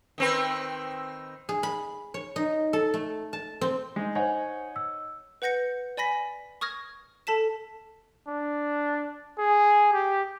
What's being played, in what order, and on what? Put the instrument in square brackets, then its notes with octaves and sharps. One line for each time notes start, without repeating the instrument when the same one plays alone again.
[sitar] D#3 C4 B4
[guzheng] G#4
B5
C#5
D#4
A4
A3
A5
C4
[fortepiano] G#3 D#4
[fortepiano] D#4 C#5 F#5 [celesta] C5 G#5
[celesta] E6
[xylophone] B4 F#5 G6 A#6 C#7
D5 G#5 B5 A#6 B6
C#6 D#6 F6 G#6 A#6
A4 A5 B6 E7
[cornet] D4
G#4
G4